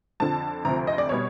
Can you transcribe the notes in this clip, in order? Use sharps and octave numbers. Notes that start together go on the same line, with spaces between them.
F2 D3 F3 A5
D2 C3 F3 A#5
D#5
D5
B2 G3 C#5